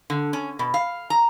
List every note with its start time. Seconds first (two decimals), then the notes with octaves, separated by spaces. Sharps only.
0.10 D3
0.33 C#4
0.59 B2
0.74 F5
1.10 A#5